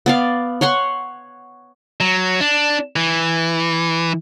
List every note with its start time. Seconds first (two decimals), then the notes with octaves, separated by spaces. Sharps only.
0.06 B3 D5 F5
0.61 C#5 F#5 C6 C#6
2.00 F#3
2.41 D4
2.96 E3